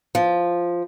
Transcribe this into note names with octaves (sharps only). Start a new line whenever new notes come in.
F3